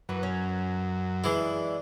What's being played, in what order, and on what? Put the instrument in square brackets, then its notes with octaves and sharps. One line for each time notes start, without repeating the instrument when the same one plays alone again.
[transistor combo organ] F#2 [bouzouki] E3 B4 C#5
[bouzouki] C#4
[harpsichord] E3 E4 [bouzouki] G#3 D4